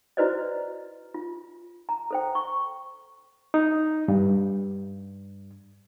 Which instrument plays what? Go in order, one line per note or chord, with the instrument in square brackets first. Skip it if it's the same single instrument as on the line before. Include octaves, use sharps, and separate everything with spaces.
[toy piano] E4 F#4 B4 C5 D5 D#5
F4
A#5
A4 C5 G5
C#6
[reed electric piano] D#4
G2